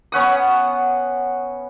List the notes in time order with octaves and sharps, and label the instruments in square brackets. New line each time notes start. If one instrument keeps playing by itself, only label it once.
[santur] B3 C#4 F#5 D#6